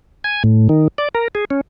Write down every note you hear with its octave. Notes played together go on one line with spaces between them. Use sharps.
G#5
A2
D#3
D5
A#4
G#4
C#4